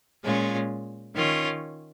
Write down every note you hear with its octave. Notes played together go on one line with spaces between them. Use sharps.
A#2 G#3 C#4 F4
D#3 C#4 F4 C#5